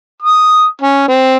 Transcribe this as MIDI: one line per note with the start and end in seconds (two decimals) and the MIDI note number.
0.22 0.64 87
0.81 1.07 61
1.08 1.37 60